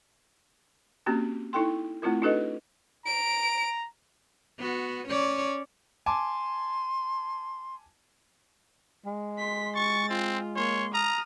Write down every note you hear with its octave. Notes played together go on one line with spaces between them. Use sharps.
A#3 C4 C#4 F#4 G4
D#4 E4 A4 G5 C6
A3 C4 E4 F4 A#4
D4 D#4 F#4 A4 B4 D#5
A#5 D7
B3 F#4
C#4 C#5 D5
G#5 A5 C6 D6
G#3
C6 B6
C#6 A6
C4 F4
A#3 C#5 C6
A#5 D#6 F6